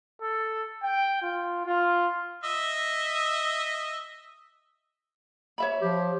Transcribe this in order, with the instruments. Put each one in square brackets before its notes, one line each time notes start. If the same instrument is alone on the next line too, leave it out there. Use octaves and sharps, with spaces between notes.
[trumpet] A4
G5
F4
F4
[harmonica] D#5 E5
[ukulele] C#5 E5 B5
[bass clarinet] F3 [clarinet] G4